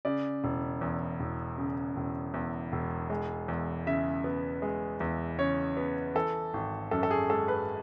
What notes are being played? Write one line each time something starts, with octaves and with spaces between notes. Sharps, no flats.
C#3 D5
E1
E2
E1
C#3
E1
E2
E1
G#3
E2
C#3 E5
B3
G#3
E2
C#3 C#5
B3
E3 A4
G#1
F#2 A4
A4
G#4
G#3 A4
B4